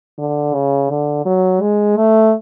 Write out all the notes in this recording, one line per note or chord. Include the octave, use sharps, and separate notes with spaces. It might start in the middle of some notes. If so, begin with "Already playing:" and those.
D3
C#3
D3
F#3
G#3
A3